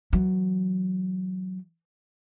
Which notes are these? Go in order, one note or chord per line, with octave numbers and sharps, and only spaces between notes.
E3 F#3